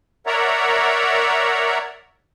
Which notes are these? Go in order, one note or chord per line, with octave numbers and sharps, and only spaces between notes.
A#4 C#5 D5 E5 F#5 A#5